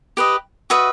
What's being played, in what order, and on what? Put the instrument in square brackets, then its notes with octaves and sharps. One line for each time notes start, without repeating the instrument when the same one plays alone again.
[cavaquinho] G4 B4 D#5
F#4 B4 D#5 E5